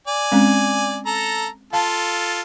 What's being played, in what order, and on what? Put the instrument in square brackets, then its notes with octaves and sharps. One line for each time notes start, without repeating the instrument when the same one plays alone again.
[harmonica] D5 G#5
[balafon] G#3 C4 C#4
[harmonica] A4 A#5
[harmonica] F4 A4 [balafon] F5 A5